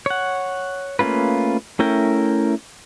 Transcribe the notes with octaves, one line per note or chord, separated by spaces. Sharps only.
C#5 F#5
A3 A#3 C#4 F4 B4
A3 C#4 E4 A#4 G5